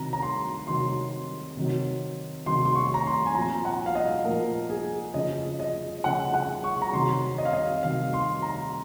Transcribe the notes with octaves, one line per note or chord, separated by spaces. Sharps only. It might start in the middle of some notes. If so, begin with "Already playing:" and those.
Already playing: C3 D#3 F#3 A#5
A#5
C6
C3 D#3 F#3 C6
C3 D#3 F#3
C3 D#3 F#3 C6
C6
C#6
A#5
C6
G#5
A#2 F3 A#5
F#5
F5
D#5
A#2 F3 A#4
G#4
C#3 F3 D#5
D#5
C#3 F3 F#5
F#5
C#6
A#5
C3 D#3 F#3 C6
D#5
F5
D#5
C3 D#3 F#3 F5
C6
A#5